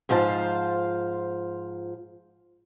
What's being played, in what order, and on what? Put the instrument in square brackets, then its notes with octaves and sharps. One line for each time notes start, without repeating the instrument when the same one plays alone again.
[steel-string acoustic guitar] G#2 F3 F4 C5 A5